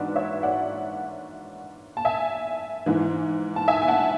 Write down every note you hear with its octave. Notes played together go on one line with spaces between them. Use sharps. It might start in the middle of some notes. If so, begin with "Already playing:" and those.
Already playing: G#2 E3 D4 F#4 B4 D5
C#5 E5
D5 F#5
A5
E5 G#5
G#2 E3
A5
E5 G#5
G#5
F#5 A5